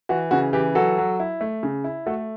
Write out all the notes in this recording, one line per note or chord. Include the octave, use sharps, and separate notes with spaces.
E3 F#4
C#3 F#4
E3 G4
F#3 F#4 A4
F#3
E4
A3
C#3
E4
A3 F#4 A4